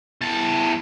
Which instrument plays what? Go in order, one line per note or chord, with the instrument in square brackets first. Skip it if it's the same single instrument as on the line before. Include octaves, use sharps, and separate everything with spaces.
[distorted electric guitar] E2 A5